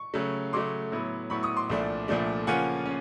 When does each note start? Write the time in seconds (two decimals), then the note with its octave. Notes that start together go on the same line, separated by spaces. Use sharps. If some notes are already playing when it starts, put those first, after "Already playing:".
Already playing: C#6
0.14 C#3 F#3 A3
0.53 C#3 F#3 A3 C6 D6
0.92 A2 F#3 B3 E4
1.30 A2 F#3 B3 E4 B5 C#6
1.43 C#6 D#6
1.57 C6 D6
1.70 C2 A#2 F3 A3 D4
2.08 C2 A#2 F3 A3 D4
2.47 C#3 F3 A#3 C#4 F4 F#5 G#5
2.86 C#4